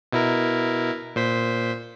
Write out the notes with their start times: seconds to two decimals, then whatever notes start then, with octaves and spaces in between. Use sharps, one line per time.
0.13 B2 E4 A#4
1.16 A#2 C5 B6